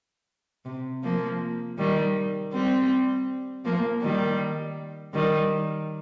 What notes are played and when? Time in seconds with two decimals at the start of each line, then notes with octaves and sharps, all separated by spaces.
0.65 C3
1.03 F3 A#3
1.78 D#3 G3
2.53 G3 C4
3.64 F3 A#3
4.02 D#3 G3
5.14 D#3 G3